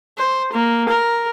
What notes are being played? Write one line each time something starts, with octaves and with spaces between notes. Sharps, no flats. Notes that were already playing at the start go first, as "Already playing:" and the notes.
C5
A#3
A#4